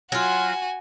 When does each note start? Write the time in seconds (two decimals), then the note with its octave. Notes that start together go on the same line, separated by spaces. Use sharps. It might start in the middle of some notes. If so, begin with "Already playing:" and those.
0.12 F#3 F4 F#4 G#5